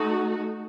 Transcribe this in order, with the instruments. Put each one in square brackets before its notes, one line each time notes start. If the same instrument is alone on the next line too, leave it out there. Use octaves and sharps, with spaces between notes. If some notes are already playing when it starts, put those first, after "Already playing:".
Already playing: [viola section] A3 D#4 F#4